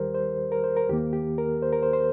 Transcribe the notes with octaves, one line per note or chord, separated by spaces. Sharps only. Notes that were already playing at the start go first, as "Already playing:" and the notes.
Already playing: D#2 D#3 G3 G4 A#4 C5
C5
A#4
C5
A#4
D#2 D#3 A#3 G4
G4
A#4
C5
A#4
C5
C5